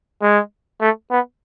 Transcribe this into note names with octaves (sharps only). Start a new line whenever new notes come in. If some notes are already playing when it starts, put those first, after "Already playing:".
G#3
A3
B3